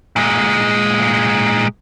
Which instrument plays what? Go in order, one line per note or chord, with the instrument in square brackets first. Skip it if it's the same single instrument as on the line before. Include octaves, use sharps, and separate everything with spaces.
[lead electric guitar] A#2 G#3